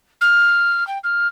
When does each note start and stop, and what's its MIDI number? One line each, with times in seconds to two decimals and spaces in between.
0.21 0.86 89
0.87 0.98 79
1.03 1.27 89